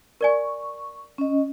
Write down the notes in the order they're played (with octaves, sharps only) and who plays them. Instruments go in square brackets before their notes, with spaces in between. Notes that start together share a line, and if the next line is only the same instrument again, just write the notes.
[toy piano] A#4 D5 G#5 [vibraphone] C#6
[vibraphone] C#4 D#5